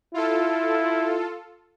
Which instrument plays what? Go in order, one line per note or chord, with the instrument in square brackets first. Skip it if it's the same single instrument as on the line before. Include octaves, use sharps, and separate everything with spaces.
[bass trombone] E4 [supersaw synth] F4 A4